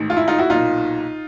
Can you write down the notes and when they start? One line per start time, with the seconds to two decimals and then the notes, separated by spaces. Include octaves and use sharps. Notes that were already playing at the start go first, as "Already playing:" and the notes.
Already playing: A1 G#2 D#3
0.10 F4
0.17 E4
0.28 D#4 F4
0.38 E4 F#4
0.50 B1 A#2 D#4 F4